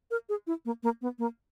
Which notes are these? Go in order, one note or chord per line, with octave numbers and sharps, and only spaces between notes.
A#4
G#4
E4
A#3
A#3
B3
A#3